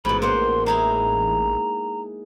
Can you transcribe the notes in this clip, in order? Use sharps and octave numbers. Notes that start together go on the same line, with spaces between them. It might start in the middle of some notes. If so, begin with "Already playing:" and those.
A1 G#2 B2 B5
A#3 C5 F#5 C6
G#3 D#4 E4 A#5